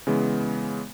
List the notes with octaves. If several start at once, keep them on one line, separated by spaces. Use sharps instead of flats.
C#3 E3 G#3 B3